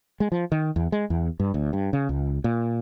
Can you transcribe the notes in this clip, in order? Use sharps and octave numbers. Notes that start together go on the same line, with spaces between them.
G#3
F3
D#3
E2
G#3
E2
G2
D2
G2
C#3
C#2
A#2